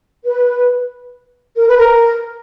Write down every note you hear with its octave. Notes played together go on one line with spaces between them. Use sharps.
B4
A#4
B4
A#4